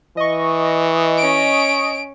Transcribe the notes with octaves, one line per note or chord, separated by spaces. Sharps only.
E3 D#5 C#6
C#4 D7